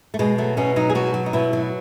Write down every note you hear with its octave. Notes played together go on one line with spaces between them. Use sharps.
A3
B2 G#3
F#3 A3
B2 C#4
F#3 D#4
G#4
B2 F#4
F#3
D#4
B2 E4
F#3